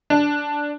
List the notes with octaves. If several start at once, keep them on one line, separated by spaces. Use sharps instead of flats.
D4